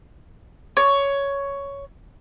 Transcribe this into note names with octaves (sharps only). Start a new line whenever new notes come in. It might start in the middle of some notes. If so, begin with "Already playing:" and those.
C#5